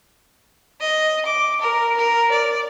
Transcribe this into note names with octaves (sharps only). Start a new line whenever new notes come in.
D#5
D6
A#4
A#4
D5